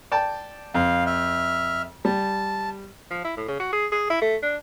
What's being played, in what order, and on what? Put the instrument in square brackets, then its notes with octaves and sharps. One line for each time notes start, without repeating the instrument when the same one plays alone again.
[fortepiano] D5 G5 A5
[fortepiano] F2 [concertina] F5
[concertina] E5 F6
[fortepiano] G3 [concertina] A5
[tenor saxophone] F3
E4
A2
C#3
F#4
G#4
G#4
E4
A3
D4